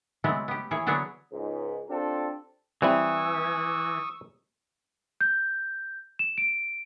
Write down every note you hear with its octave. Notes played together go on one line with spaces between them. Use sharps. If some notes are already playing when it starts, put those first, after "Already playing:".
C#3 F#3 G#3 A3 B3 C4
B3 G4
E3 A#3 G#4 C#5
D3 F#3 B3 D4 G#4 C#5
C#2 G#2
C4 D4 F4 G4 A4
E3 G3 C4 E4 C#6 D#6 E6
G6
E7
D7